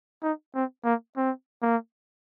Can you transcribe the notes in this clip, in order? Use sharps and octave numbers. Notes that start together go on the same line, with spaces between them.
D#4
C4
A#3
C4
A#3